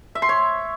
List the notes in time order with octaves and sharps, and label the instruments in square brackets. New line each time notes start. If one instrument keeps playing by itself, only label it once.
[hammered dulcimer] E5
C6
C#5